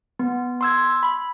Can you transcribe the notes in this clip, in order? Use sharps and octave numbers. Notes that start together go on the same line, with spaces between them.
B3
C6 E6 G#6
B5